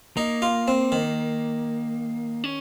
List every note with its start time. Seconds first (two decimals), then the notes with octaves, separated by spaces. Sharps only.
0.17 A#3 D#4
0.42 F4
0.68 C4
0.92 D#3
2.44 C#4